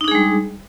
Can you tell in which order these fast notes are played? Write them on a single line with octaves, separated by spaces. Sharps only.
D#4 D4 G#4 G#3 G3